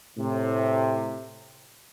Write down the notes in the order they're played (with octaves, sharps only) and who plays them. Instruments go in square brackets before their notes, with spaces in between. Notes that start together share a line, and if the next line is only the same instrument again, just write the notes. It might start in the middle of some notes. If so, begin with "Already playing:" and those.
[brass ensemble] A2 C3